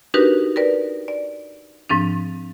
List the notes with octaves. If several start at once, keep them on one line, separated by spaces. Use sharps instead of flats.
D4 D#4 F#4 G4 A#4 B4
A#4 B4 D5
D5
G#2 F3 C4 D4